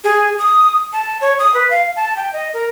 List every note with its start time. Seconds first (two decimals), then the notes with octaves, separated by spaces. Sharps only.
0.04 G#4
0.38 D#6
0.93 A5
1.21 C#5
1.39 D#6
1.54 B4
1.70 F5
1.96 A5
2.16 G5
2.33 D#5
2.53 A#4